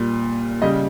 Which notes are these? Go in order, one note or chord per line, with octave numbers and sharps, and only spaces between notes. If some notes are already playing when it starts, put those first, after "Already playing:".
Already playing: A#2 G3
C#3 G3 D#5